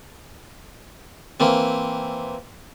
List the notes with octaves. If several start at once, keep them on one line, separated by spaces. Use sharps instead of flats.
E3 A#3 C4